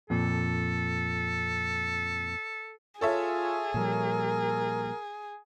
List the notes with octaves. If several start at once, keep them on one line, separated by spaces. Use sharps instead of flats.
F2 A#2 A4
F4 G#4 A4 C#5 E5
A#2 F3 G3 A#4